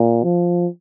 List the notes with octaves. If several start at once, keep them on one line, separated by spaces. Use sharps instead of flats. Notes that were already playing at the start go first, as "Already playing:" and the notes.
Already playing: A#2
F3